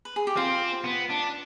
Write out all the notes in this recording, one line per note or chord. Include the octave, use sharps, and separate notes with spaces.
B4
G#4
G4
C4 F4
B3
D4